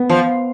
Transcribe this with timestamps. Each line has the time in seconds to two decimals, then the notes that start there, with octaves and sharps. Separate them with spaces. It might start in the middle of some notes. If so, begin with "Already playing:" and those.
Already playing: B3
0.10 F3